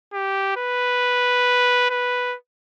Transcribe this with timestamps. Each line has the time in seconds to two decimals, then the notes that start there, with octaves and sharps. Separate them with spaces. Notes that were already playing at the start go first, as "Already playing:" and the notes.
0.13 G4
0.57 B4
1.90 B4